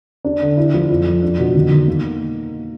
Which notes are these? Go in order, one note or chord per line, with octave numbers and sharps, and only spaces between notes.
D4
D3
E4
F3
F2
F2
D4
B2
D#3
D#3
A#3